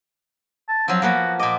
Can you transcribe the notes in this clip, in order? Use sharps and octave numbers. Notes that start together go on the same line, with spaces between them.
A5
F3 F#3 C4
F3 A#3 B3 F#4
A#2 D#5 D6